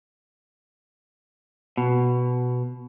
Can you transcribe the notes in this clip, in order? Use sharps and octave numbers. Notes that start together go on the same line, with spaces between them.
B2